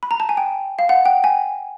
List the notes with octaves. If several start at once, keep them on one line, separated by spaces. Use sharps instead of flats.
B5
A#5
A5
G#5
G5
F5
F#5
G5
G#5